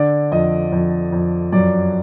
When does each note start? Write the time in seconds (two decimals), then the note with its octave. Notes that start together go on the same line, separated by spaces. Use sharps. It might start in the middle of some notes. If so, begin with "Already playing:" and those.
Already playing: D3 D5
0.32 F2 D#5
0.72 F2
1.12 F2
1.52 F#2 D5